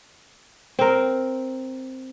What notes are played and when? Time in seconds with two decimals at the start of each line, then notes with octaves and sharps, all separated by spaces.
0.79 C4 A#4